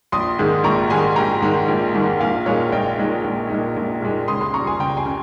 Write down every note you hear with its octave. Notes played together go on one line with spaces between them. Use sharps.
A#1 C6 D#6
G#2 D#3 G#3
A#1 A#5 C#6
G#2 D#3 G#3 G#5 C6
A#1 G5 A#5
G#2 D#3 G#3
A#1
G#2 D#3 G#3
A#1 F5 G#5
A#2 G#3 D#4 C#5 F5
A#1 D#5 G5
A#2 G#3 D#4
A#1
A#2 G#3 D#4
A#1
A#2 G#3 D#4
C#2 C6 D#6
C6 D#6
C#3 G3 A#5 C#6
G#5 C6
C#2 G5 A#5
G#5 C6
C#3